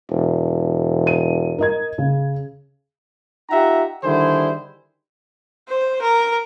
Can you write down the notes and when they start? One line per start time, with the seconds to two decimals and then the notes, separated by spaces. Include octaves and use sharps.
0.11 E1
1.07 D#7
1.58 A#4 D#5 G#6
1.98 C#3
3.50 D#4 F4 G4 E5 F#5 A#5
4.03 D3 D#3 G3 E4 G#4 C5
5.68 C5
6.02 A#4